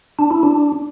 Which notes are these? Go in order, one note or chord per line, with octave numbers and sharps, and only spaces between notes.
D4
E4
D4